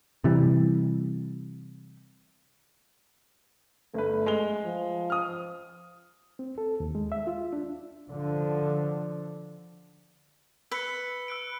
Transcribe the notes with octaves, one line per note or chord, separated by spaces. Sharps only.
C3 E3 G3
G1 A3 B4
G#3 F7 G7
F3
D#6 F6
C4
A4
D#2
G#3
E5
F4
D4
D3 F3
B4 B5 E6 C#7
E6 F#6 D7